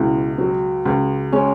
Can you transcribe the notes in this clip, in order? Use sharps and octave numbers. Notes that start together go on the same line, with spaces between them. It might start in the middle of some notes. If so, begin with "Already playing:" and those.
Already playing: C#2 B2 E4
F#3
C#2
G#3 C#4